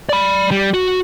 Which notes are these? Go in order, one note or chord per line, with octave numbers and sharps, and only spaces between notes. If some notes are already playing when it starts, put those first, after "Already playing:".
D5 B5
G3
F#4